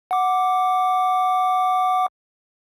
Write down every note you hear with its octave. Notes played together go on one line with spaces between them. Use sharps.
F#5 D6